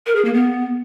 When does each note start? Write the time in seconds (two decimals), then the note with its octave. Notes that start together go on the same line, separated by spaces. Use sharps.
0.06 A#4
0.16 G#4
0.25 A#3
0.34 B3